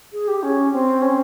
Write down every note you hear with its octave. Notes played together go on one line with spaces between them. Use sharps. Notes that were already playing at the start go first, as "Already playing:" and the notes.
G#4
G4
C#4
C4
C#4